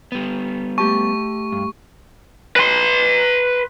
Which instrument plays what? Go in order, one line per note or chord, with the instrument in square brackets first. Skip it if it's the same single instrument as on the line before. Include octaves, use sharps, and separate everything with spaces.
[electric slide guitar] G3 B3
[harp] A3 G4 A5 [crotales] C#6
[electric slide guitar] G2
[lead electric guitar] B4 C6